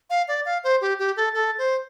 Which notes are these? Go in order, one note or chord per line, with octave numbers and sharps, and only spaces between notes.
F5
D5
F5
C5
G4
G4
A4
A4
C5